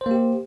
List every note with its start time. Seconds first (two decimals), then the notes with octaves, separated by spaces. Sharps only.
0.01 C5
0.06 A#3
0.11 G4